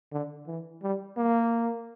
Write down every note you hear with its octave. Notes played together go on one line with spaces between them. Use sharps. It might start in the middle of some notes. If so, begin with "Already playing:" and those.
D3
E3
G3
A#3